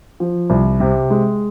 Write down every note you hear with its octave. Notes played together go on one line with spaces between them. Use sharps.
F3
C2
C3
G#3